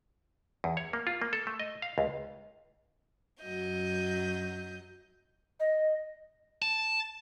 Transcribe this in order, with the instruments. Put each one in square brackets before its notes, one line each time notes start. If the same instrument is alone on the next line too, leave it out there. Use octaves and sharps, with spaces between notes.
[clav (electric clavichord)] E2
C#5
A#3
F4
A#3
A4
A3
D#5
F5
C#2
[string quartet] F#2 F#3 D#5 G6
[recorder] D#5
[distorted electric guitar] A5